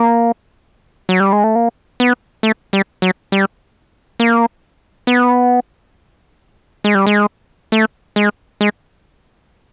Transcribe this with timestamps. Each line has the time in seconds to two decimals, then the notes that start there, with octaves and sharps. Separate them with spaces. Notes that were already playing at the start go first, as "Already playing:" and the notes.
Already playing: A#3
1.09 F#3
1.20 G3
1.33 G#3
1.44 A3
1.55 A#3
2.00 B3
2.43 A3
2.73 G3
3.02 F#3
3.32 G3
4.20 A#3
5.07 B3
6.84 G#3
6.95 G3
7.07 G#3
7.72 A3
8.16 G#3
8.61 G#3